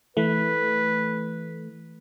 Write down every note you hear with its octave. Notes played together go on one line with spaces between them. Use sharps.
E3 A3 B4